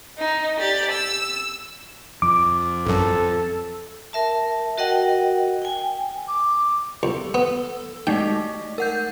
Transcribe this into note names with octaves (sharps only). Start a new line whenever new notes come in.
D#4
G4 D5
E6
F2 D6
A1 F#2 A4
A#4 E5 A5
F#4 A#4 D#5 F#5 G5
G5 G#5
D6
C2 A4
B3
G#3 A3 D#4 G5
A#4 F#5 G6